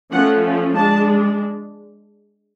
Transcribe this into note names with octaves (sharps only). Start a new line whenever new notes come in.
F3 A3 C#4 F#5
G#3 D4 A5